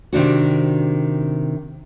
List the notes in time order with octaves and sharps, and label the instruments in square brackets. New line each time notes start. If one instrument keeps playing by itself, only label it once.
[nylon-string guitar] C3 D#3 D4 F#4